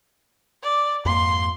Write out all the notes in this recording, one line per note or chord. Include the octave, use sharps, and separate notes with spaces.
D5
F2 G#2 A#3 C6